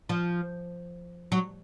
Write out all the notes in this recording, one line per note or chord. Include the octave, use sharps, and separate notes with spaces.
F3
F#3